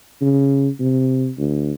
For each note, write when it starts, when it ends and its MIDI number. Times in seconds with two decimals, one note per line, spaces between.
0.21 0.68 49
0.80 1.30 48
1.38 1.72 38